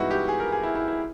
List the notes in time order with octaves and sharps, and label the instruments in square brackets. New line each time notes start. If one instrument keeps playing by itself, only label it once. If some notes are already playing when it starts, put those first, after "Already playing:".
Already playing: [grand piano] G2 E3 G#3 B3 D#4 E4 F#4
G4
G#4
A#4
G#4
E4
E4
E4